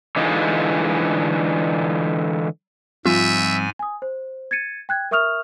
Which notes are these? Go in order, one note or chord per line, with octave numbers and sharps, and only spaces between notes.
D3 E3 G#3 D#4 F4
G#2 F3 G3 C4 F4 E5 G#5
G#5 D#6
C5
G#6 A6 C#7 D#7
G5 F#6 G#6
A#4 E5 C#6 D#6 F6 F7